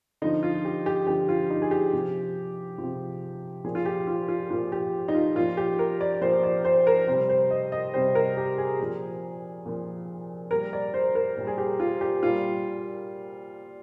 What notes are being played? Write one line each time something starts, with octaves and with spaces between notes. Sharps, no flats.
D3 F3 D#4
F4
G4
G4
D3 F3 G4
F4
D#4
G#4
G4
C3 F3
C3 F3
A#2 F3 G#4
F4
G4
F4
F4
A#2 F3 F4
G4
D#4
F4
A#2 F3 F4
G4
A#4
D5
A#2 F3 C5
D5
C5
A#4
C3 G3 C5
C5
D#5
D#5
C3 G3 C5
A#4
G4
G#4
A#2 F3
A#2 F3
A#2 G3 A#4
D5
C5
A#4
A#2 G3
G#4
G4
F4
G4
A#2 G3 F4